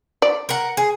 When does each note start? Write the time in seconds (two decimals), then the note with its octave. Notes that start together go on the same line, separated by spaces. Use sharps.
0.22 D5
0.49 A#4 F#5
0.77 G#4